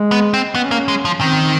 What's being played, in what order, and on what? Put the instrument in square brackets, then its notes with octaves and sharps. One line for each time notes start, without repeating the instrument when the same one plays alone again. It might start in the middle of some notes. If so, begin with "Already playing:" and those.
Already playing: [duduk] G#3
[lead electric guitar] B3
C4
[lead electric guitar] B3 [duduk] C#4
[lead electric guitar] A#3
G#3
F3
[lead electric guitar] D#3 [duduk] C4